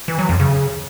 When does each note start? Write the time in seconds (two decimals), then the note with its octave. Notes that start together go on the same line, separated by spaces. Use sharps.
0.08 E3
0.19 F#3
0.29 F2
0.40 C#3